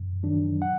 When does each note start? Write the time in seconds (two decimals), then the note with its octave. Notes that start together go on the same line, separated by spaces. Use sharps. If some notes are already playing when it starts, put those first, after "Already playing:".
Already playing: F#2
0.23 D#3 F#3 D4
0.62 F#5